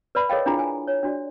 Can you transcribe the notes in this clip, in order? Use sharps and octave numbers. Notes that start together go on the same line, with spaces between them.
B4 D5 B5
G#4 A#4 C#5 D#5 F5 G5
D4 E4 F4 G#4 A#5
G#5
C#5
D4 F#4 D5